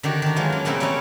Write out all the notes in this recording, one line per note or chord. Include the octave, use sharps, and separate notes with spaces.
D3 D#3 F#4 G4
D#3 D4
E3 F#3 G#3 A#3 F4
C#4
A#2 C#3 A3 C4 E4 A#4
G3 C#4 E4 A4 A#4 C#5